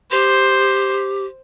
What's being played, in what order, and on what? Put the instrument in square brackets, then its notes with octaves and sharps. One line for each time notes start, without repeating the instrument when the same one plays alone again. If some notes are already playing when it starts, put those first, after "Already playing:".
[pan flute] G4 [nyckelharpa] C5